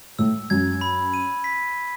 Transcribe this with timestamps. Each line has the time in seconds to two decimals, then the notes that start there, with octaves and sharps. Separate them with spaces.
0.19 A2 E6
0.50 F#2 G#6
0.81 B5
1.14 D#7
1.44 B6